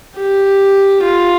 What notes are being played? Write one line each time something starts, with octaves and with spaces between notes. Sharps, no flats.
G4
F4